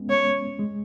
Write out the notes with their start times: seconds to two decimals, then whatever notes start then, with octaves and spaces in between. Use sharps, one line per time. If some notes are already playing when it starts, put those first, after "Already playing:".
Already playing: G#3 B3 C#4
0.10 C#5
0.59 G#3